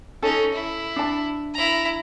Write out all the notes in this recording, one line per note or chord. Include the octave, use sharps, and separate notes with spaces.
C#4 D#4 A4
E4
D4 A5
E4 A#5